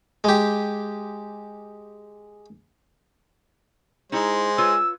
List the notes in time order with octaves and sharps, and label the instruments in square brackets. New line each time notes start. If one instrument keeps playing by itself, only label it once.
[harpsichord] G#3 G4
[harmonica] G#3 [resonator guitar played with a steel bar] D#4 E4 A#5 [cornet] C5
[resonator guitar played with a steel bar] F4 B4 C#5 [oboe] E6